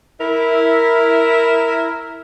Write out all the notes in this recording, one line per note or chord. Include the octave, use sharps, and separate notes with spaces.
E4 A#4